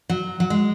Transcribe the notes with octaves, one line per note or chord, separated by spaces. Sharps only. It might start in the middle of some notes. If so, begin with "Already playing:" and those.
F#3
F#3
G#3